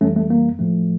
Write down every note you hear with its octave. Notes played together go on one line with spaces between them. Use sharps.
F2 E3 G3 A3 C#4
A3
A#3
A2 F3 A3